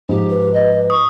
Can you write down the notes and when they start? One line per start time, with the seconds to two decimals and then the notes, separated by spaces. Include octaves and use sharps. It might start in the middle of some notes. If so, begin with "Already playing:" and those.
0.09 G#2 F3 D#4 G4
0.30 B4
0.53 D#5
0.90 C#6 D#6